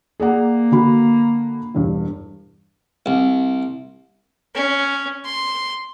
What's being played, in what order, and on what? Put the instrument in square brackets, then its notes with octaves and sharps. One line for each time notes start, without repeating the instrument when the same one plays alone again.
[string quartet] A#3 [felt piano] G#4 D5 F#5
[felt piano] D3 F#4 B5
E1 G2
[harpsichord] C2
[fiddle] C#4
C6